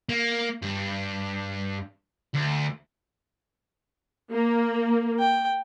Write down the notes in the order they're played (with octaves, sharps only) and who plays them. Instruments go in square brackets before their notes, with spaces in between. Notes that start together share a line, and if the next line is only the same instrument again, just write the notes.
[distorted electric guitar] A#3
G2
D2
[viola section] A#3
[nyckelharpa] G5